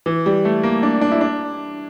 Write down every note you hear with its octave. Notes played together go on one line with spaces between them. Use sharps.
E3
G3
A3
A#3
D4
D4
E4
D4